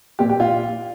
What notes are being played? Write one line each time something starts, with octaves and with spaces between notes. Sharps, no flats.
A#2 G4
G4
F4